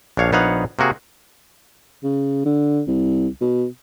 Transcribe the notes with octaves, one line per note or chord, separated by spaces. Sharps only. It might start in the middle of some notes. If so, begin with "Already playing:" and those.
A#1 D4 C#5 F5
A#1 B3 D#4 C#5 F5 F#5
C3 A#3 F#4 G#4
C#3
D3
C2
B2